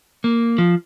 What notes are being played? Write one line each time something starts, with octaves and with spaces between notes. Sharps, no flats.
A#3
F3